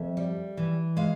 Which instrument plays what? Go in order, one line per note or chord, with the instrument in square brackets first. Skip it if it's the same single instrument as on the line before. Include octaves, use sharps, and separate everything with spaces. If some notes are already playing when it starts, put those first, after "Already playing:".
Already playing: [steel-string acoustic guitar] F2 E5
G3
E3
G#3 F5